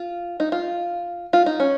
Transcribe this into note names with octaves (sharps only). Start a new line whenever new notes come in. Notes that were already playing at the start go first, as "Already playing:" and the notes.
Already playing: F4
D#4
F4
F4
D#4
C#4